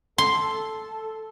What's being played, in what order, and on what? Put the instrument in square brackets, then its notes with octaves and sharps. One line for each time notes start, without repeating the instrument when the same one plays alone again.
[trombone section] A4 [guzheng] C6